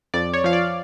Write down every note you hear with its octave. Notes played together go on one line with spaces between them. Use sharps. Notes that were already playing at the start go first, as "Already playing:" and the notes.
F2 D5
C#5
F3 F5
D5